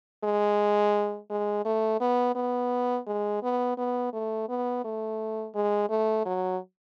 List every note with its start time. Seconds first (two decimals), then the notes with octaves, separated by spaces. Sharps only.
0.24 G#3
1.30 G#3
1.65 A3
2.01 B3
2.36 B3
3.07 G#3
3.43 B3
3.78 B3
4.13 A3
4.49 B3
4.84 A3
5.55 G#3
5.89 A3
6.25 F#3